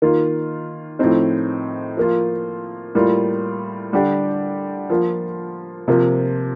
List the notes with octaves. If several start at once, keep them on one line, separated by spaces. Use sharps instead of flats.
D#3 A#3 F4
A2 F3 C4 D#4
F3 A#3 F4
A2 G3 A#3 F4
D3 G3 D4 G4
F3 A#3 F4
C3 F3 A#3